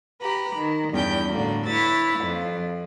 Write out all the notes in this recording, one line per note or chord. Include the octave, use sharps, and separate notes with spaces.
G4 B4 A#5 B5
D#3
E2 G2 C#4 G5 G6
A2 D3 A#3 F#4
E4 B4 C#5 E6 A6
F2